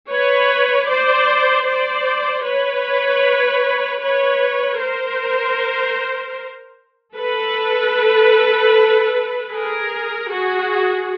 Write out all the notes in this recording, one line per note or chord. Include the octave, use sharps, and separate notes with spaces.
B4 C#5
C5 D5
C5 D5
B4 C#5
B4 C#5
A#4 C5
A4 B4
G#4 A#4
F#4 G#4